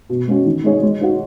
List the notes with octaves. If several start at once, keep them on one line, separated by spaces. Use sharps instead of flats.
B2
G#3 C#4 F#4
D#3
G#3 D#4 G#4 C#5
G#3
D#4 F#4